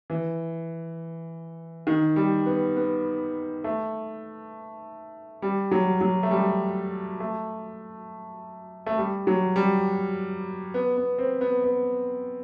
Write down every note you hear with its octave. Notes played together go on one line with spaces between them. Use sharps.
E3
D#3
G3
B3
B3
A3
G3
F#3
F#3
A3
G3
A3
A3
G3
F#3
G3
B3
B3
C4
B3
B3